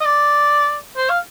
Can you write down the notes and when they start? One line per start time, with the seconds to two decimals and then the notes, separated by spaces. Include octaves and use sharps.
0.01 D#5
0.05 D5
0.97 C5
1.09 F5